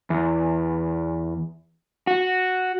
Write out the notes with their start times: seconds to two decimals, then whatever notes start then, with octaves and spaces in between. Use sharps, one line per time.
0.10 E2
2.07 F#4